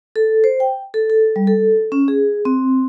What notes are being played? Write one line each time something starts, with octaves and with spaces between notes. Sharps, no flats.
A4
C5
G5
A4
A4
G3
A4
C#4
G#4
C4